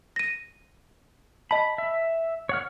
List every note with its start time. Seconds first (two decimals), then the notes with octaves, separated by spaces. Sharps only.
0.16 A#6 D#7
1.51 D#5 A5 B5
1.78 E5
2.49 C#5 F#5 F6